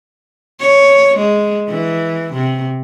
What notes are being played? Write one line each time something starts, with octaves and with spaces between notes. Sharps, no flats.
C#5
G#3
E3
C3